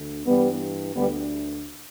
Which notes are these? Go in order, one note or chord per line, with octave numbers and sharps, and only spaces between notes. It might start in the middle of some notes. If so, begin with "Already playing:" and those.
Already playing: D2 D3
G2 E3 G3 B3
D2 D3 G3 B3